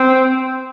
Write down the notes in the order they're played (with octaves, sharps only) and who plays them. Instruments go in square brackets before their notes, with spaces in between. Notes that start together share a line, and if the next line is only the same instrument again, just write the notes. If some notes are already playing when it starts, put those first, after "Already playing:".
Already playing: [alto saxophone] C4